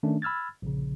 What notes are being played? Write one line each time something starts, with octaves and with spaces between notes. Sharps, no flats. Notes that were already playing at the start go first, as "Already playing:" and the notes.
D#3 A3 C#4 D4
B5 E6 F6 G#6 A6
A#1 C#3